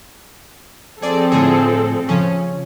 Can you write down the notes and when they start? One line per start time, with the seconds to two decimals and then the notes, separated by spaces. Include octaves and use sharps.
1.02 F3 C4 G#4 A4 D5
1.32 A2 D3 G#4
2.09 C#3 F3 C#4